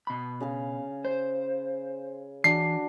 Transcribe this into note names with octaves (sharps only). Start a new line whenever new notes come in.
B2 B5
C#3 G#4 F5
C5
E3 D4 F#4 C7